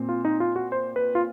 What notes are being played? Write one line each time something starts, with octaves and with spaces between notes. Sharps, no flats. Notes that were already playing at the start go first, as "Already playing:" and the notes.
Already playing: A#2 C4
F4
D#4
F4
F#4
C5
B4
F4